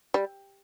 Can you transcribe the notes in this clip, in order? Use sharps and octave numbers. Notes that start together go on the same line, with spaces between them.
G3